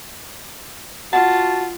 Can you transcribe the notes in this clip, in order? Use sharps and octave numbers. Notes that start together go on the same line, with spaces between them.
F4 F#4 F#5 A5